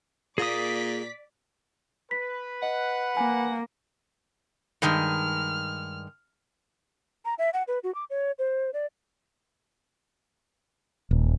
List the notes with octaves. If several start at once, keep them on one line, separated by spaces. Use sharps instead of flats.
A#2 A#3 F4 G#4 D5 D6 D#6 B6
B4 B6
D#5 F#5
A#3 G#5
G2 D#3 G#3 F6
A#5
E5
F#5
B4
F#4
D6
C#5
C5
D5
D#1